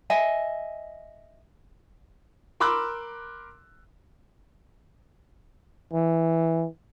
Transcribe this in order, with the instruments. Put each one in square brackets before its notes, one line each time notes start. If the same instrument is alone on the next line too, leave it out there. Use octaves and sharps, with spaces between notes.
[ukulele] D#5 E5 G#5
[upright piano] A#4 B5 C6 D6 E6 F#6
[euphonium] E3